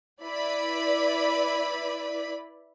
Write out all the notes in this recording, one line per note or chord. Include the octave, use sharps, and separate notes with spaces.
E4 B4 D5 B5